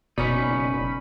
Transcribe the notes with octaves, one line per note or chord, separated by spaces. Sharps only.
F#1 B2 C#4 D#4 D5 B5